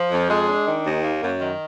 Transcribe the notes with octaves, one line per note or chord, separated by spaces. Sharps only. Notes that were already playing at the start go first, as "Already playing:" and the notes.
Already playing: F3
F2
G#3
D4
D#3
D#2
A#3
F#2
D#3